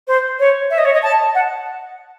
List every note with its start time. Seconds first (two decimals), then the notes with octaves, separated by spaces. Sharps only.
0.07 C5
0.39 C#5
0.70 E5
0.78 D#5
0.85 C#5
0.93 D#5
1.02 A5
1.34 F#5